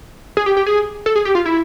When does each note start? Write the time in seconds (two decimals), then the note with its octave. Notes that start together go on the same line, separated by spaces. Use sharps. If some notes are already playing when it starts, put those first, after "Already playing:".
0.37 G#4
0.46 G4
0.57 G4
0.66 G#4
1.06 A4
1.16 G#4
1.25 G4
1.35 F4
1.46 E4